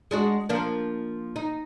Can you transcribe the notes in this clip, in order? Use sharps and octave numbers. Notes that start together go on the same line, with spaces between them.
G#3 D4 F#4
F3 A#3 D4
D#4